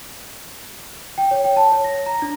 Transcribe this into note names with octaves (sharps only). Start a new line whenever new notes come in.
G5
C#5
G5
A5
C#5
A#6
A#5
D4